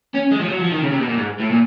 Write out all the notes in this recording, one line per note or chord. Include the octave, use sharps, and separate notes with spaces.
C#4
G#3
F3
F#3
F3
D#3
C#3
C3
B2
A#2
G#2
A2
A#2